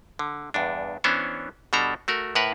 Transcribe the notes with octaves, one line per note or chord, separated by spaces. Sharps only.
D3
E2 G2 D4
E3 B3 C#4 D4 C5 C#5
B2 G3 D4 A4 A#5
A3 F#4 A#4
A2 A#4 B4 F#5